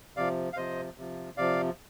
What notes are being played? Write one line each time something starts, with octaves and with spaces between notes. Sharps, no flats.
C3 F3 D5 F5
F5
C3 F3 C5 D#5
C3 F3
C3 F3 D5 F5